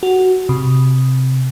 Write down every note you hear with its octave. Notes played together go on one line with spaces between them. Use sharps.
F#4
C3